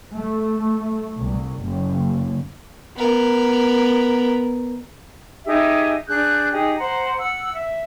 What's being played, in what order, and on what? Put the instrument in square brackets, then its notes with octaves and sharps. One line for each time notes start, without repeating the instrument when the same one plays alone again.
[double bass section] A3
C2
F#1
[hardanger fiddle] B3 A#4
[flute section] D#4 G4 G#4 E5
D4 G#4 F#6 G6
D#4 G4 G#4
C5 F#5 A#5
F#5 E6
E5